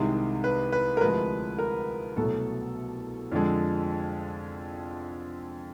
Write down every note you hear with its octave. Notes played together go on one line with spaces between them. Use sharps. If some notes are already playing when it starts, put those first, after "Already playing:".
Already playing: C2 C3 D#3 G#3
B4
B4
A#4
D2 C3 F3 G#3 B4
A#4
C2 B2 F#3 A3 A4
F2 D3 F3 G#3